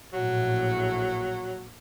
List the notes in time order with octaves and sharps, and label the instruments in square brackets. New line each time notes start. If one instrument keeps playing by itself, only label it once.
[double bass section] A#1 A2 [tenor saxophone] F#3